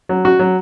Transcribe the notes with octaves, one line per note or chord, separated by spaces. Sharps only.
F#3
F#4
F#3